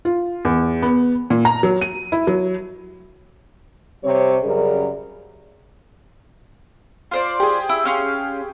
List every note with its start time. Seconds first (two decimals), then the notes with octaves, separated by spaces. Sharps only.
0.05 F4
0.45 E2
0.82 B3
1.30 A#2
1.45 A#5
1.63 F#3
1.81 D#7
2.12 E4
2.27 F#3
4.04 C3 G3 C4 C#5
4.43 F#2 C#3 G3 G#4 A#4
7.11 F4 C5 D5
7.40 G4 G#4
7.69 E4
7.85 C#4 F5 C6